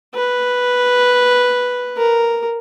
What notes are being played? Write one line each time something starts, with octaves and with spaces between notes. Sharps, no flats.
B4
A#4